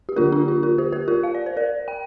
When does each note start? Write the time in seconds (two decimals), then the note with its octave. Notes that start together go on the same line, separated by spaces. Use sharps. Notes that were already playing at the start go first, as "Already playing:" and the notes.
0.09 G4
0.16 D3 A#3 D4 F4 A#4
0.32 D4 G4
0.48 F4
0.63 F4 A#4
0.78 G4 C5
0.92 G4 C5
1.08 F4 A#4
1.23 F5
1.35 D5
1.46 C5
1.57 A#4 D5
1.88 G5